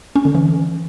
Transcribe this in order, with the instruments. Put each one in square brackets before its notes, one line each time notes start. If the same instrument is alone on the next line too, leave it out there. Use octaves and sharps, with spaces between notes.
[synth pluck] C#4
D3
E3